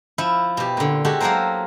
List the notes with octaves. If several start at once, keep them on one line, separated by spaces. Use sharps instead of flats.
F3 E4
B2 G4
A#2 D3
G#3 F#4 G4 A4
F#3 A#3 G4 A4 A#4 C5